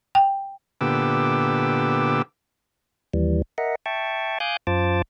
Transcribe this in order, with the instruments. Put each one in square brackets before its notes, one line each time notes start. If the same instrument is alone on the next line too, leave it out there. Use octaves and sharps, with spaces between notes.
[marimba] G5
[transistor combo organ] A#2 D3 B3 G4 D6 E6
[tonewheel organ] D#2 E3 G3
A#4 D#5 E5 F#5
E5 G5 A5 C#6
F5 G#5 D6 D#6 F#6 G6
F#2 F4 C5 A5 D6